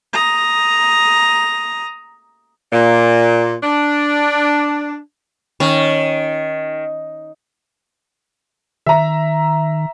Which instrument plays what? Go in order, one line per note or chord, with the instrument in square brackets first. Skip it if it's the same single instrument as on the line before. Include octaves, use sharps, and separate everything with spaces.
[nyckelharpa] A#5 D#6
[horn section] A#2
D4
[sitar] D#3 [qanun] C#4
[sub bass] D#3 [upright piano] E5 A#5